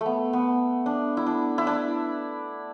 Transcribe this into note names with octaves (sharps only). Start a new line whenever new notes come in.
A3 B3
B3
D4
E4
D4
E4
D4